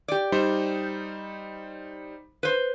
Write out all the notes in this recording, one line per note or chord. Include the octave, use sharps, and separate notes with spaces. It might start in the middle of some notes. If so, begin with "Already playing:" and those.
G4 D5
G3 D#4 C5
B4 C5